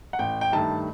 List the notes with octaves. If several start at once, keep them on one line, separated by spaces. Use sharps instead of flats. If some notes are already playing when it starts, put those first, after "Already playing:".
F#5
A1 G5
G5
G2 D#3 A3 A5